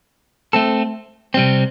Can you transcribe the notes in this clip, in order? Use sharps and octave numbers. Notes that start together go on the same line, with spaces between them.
A3 C4 A4
C3 G3 C4